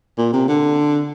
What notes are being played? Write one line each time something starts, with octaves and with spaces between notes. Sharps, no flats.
A#2
C3
D3